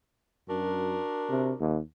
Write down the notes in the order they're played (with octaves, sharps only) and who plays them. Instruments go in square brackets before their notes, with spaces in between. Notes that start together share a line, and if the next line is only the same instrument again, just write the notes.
[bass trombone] F#2 [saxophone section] D4 F#4 A#4
[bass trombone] C3
D#2